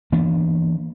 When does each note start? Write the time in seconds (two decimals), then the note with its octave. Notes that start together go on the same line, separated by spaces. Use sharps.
0.12 E3 A#3 B3 D4